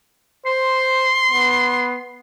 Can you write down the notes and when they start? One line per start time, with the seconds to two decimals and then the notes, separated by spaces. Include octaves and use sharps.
0.46 C5 C6
1.31 B3